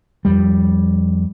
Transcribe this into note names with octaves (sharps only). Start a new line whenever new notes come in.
F2 G3